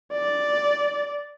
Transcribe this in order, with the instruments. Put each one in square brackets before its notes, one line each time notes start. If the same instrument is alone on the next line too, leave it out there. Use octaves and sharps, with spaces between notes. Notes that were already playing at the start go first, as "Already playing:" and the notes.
[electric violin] D5